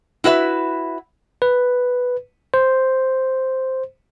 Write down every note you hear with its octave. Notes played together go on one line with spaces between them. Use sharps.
E4 F#4 B4 E5
B4
C5